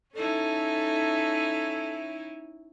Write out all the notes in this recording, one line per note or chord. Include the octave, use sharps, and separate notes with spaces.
C#4 D#4 E4 A4